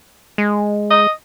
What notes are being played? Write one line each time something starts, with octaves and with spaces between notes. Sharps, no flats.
G#3
D#5